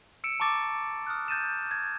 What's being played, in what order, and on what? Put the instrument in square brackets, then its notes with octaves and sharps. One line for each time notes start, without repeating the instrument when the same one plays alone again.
[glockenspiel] E6 C#7 D7 E7
A5 A#5 C#6 D6 A6
D#6 F6 F#6
G6 A6 D#7 E7
G#6